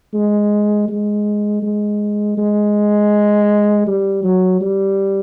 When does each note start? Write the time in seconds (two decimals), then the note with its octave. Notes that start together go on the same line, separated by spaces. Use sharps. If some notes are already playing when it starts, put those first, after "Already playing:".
0.13 G#3
0.88 G#3
1.63 G#3
2.37 G#3
3.87 G3
4.23 F#3
4.61 G3